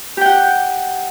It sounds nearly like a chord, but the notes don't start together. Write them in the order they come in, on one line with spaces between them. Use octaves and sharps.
G4 G5 F#5